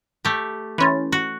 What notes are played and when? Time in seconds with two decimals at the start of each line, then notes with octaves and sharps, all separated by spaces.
0.25 A3 G4
0.78 E3 C#4 B5 C6 A6
1.12 F#4